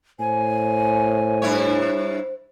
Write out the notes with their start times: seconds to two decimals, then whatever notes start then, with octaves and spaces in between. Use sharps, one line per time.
0.19 A2 C5 G#5
1.42 G2 E4 C#5